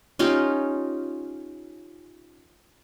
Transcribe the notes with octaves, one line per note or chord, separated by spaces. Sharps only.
C#4 D#4 F4 G4